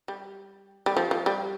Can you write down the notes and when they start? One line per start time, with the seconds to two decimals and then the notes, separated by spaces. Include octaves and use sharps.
0.08 G3
0.86 G3
0.97 F3
1.11 F3
1.26 G3